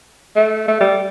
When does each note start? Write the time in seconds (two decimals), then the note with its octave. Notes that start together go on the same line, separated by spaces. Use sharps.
0.36 A3
0.68 A3
0.81 G3